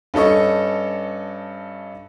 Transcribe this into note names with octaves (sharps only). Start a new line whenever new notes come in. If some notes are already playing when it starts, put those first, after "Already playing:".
G2 C#4 A4 D#5 C#6